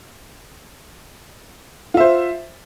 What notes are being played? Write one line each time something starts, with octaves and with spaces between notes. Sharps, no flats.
F4 C5 E5